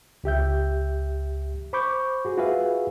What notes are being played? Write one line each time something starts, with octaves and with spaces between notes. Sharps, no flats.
C#2 G4 E5 G6
C5 B5 C#6 D6 G6
F#4 G#4
F4 F#4 G#4 B4 E5 F5